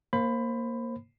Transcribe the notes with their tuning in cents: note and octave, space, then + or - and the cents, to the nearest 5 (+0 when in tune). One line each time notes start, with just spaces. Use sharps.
A#3 +0 C5 +25 B5 +20